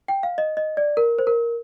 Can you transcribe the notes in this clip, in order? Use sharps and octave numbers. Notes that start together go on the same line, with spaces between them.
G5
F5
D#5
D#5
D5
A#4
C5
A#4